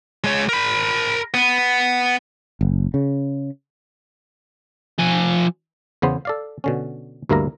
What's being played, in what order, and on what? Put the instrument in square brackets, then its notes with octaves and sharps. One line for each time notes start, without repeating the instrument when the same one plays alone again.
[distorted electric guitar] G#3 C#5
A#4 B5
B3
[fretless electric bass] F#1
C#3
[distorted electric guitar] F3 G#5
[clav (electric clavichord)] E2 C#3 B3 C5
A4 D5 F5
B2 D3 C#4
D2 G2 A#3 E4 A#4 A#5